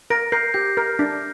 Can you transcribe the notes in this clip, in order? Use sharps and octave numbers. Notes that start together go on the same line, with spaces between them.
A#4 A#6 D7
A#4 G6 C7
G4 G6
A#4 F6
D4